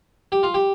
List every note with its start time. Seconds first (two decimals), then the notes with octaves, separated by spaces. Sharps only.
0.32 G4
0.43 F4
0.54 G4